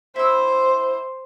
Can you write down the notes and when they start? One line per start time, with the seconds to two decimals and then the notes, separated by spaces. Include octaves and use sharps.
0.16 E4 C5 E6